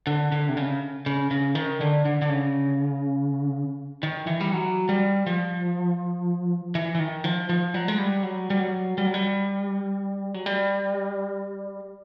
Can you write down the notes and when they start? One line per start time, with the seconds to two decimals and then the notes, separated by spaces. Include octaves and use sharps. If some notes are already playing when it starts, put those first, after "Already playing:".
0.07 D3
0.32 D3
0.49 C3
0.57 C#3
1.06 C#3
1.31 C#3
1.55 D#3
1.81 D3
2.05 D3
2.22 D3
2.30 C#3
4.03 D#3
4.27 E3
4.41 G3
4.52 F#3
4.89 G3
5.27 F3
6.75 E3
6.95 E3
7.00 D#3
7.24 F3
7.49 F3
7.74 F#3
7.88 G#3
7.98 G3
8.23 F#3
8.50 G3
8.59 F#3
8.98 G3
9.06 F#3
9.14 G3
10.34 F#3
10.46 G3